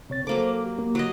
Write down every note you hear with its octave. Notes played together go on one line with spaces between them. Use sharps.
C3 C4 C#5 A6
F#3 A#3 A4 C5 D6
G4
A#3
F#3 F#4 D#5